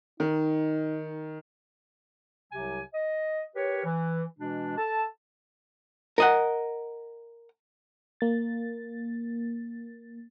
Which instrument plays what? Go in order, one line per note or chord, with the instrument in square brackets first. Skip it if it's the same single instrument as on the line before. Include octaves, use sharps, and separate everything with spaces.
[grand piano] D#3 [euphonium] D#4
[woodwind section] C2 C3 F#3 G4 G#5
D#5
G4 A#4 B4 C#5
E3
B2 E3 G#3 D4
A4 A5
[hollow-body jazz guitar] A#4 D#5 F#5
[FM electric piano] A#3 A6